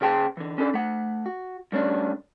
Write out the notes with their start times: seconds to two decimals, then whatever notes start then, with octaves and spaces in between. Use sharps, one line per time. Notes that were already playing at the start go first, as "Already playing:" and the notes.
0.01 C#3 G#4 G5 A5
0.37 D3 E3
0.58 C#4 D4 A4 D5
0.74 A3 F#5
1.26 F#4
1.72 G2 A3 C#4 D4